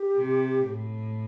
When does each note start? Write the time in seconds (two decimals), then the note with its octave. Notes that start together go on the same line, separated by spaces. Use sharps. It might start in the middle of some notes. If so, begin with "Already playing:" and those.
Already playing: G4
0.16 C3
0.64 A2